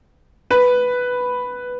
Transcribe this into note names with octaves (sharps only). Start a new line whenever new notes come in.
B4